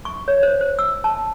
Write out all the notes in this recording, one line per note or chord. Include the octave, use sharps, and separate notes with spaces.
C#6
C#5
C5
C5
E6
A5